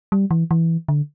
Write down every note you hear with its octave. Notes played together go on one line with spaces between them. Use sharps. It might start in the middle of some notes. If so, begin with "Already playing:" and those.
G3
E3
E3
D3